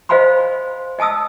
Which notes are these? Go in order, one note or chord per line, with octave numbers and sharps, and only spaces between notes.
C5 D#5 F5 G#5 B5 C6
D#5 G#5 A5 D#6 E6